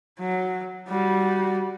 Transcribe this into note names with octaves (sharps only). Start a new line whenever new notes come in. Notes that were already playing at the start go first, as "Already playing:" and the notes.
F#3
G3 F#4